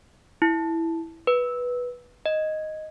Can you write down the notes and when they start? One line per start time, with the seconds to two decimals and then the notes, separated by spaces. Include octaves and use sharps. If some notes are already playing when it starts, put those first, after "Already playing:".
0.42 E4
1.27 B4
2.26 D#5